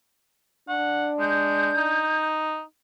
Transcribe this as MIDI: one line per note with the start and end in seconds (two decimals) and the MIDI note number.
0.69 2.09 62
0.69 1.10 78
1.19 1.71 56
1.19 2.24 91
1.77 2.62 63